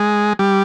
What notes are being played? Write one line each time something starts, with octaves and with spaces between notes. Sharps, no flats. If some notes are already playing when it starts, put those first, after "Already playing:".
Already playing: G#3
G3